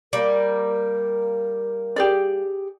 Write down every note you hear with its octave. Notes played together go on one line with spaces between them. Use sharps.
G3 A#3 A#4
G4 G#4 D5